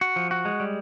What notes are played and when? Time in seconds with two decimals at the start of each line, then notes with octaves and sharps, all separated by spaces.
0.01 F#4
0.16 F3
0.31 F#4
0.45 G#3
0.60 G3